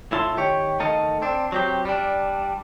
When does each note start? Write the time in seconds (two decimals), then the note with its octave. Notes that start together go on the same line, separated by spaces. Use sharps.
0.12 A2 E4 F4 A5 C6
0.37 D#3 G4 C#5
0.80 D#3 A3 D#4 A4 D#5 F5
1.22 C4 D4
1.52 F#3 C4 G4
1.85 G3 D4